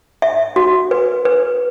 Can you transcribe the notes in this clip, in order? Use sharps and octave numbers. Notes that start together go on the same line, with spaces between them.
E5
F#4
B4
B4